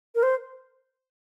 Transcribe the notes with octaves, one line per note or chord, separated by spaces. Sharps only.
A#4
C5